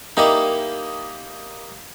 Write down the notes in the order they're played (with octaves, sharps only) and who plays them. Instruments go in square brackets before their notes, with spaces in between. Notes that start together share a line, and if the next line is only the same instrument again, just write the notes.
[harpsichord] A#3 E4 D5 [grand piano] D#4 G4 D#5